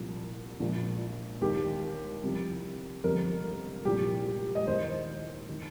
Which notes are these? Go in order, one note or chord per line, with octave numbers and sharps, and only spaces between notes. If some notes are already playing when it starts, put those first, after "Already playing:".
Already playing: C2 A#2 F3
A#1 A#2 F3
D#2 D#3 G4
C2 C3 F3
G1 F2 C3 F3 A#4
C2 A#2 F3 G4
G4
D#5
D#2 D#3 C5
D#3